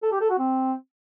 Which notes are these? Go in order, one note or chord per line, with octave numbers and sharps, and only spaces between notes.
A4
G4
A4
F#4
C4